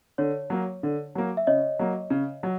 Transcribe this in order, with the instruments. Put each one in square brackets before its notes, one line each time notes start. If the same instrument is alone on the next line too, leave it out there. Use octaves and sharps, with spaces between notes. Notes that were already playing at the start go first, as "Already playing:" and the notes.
[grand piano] D3 [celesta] C#5
[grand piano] F#3 A#3
D3
F#3 A#3
[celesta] E5
[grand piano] C#3 [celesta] C#5 D#5
[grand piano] F#3 A#3
C#3
F#3